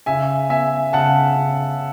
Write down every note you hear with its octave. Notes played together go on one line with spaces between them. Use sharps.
C#3 E5 G#5
B3 E5 G#5
C#3 F#5 A5
C#3